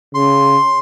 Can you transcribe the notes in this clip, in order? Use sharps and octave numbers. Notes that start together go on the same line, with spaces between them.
C#3 C6